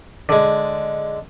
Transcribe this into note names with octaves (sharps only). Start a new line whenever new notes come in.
D3 G#3